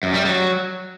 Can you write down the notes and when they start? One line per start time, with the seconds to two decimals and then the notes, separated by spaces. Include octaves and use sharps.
0.03 F#2
0.14 G3
0.25 F#3